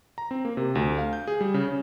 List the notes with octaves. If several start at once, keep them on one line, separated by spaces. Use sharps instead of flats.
A#5
C4
A#3
C3
D2
F5
G6
G#4
G3
C#3
C#4